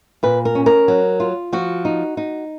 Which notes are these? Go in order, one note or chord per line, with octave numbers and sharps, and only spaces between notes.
A#2 B4
A#4
C#4
A#4
F#3
F4
F3 F#4
D#4
D#4